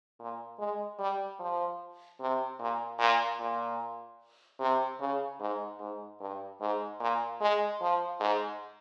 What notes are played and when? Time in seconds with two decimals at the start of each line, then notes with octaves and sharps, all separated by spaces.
0.20 A#2
0.59 G#3
0.99 G3
1.39 F3
2.20 C3
2.59 A#2
2.99 A#2
3.40 A#2
4.60 C3
5.00 C#3
5.40 G#2
5.80 G#2
6.20 G2
6.60 G#2
7.00 A#2
7.41 G#3
7.81 F3
8.20 G#2